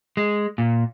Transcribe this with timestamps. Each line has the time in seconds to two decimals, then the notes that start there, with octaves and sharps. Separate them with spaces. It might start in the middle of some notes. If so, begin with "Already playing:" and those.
0.17 G#3
0.58 A#2